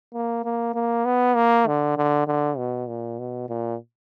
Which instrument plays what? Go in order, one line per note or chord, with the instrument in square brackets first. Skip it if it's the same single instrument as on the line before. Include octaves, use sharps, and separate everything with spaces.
[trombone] A#3
A#3
A#3
B3
A#3
D3
D3
D3
B2
A#2
B2
A#2